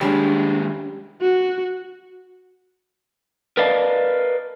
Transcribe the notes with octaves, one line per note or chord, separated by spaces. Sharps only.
D#2 G3 G#3 C#4 D4
F#4
A#4 B4 D5 D#5 F5 A5